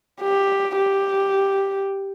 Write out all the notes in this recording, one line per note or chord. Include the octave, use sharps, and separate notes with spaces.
G4
G4